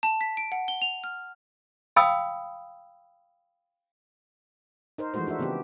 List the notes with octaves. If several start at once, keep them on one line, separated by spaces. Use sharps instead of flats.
A5
B6
D7
F#5
G7
F7
F6
F5 G5 B5 D#6 E6
D#4 A#4 C5
E3 F3 G#3 A3 F#4 C5
D4 F#4 A#4 E5
C#3 E3 B3 C4 G4